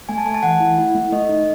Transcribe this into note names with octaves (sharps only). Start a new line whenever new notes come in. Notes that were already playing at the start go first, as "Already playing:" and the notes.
A3 G#5
A5
A3 G#5
A5
E3 F#5
E4
E4
A3
A3 D#5
D#4